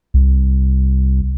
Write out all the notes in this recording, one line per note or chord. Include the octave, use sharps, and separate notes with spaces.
C2